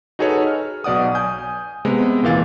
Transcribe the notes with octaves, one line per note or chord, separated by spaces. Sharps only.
D#4 F#4 G#4 A4 B4 C#5
F6
B1 B2 D5 F#5 D#6
G#5 G6
C3 G#3 B3
D#2 A#2 E3 F5 A6